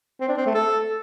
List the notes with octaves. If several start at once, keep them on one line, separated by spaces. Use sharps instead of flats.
C4
D4
C4
A3
A4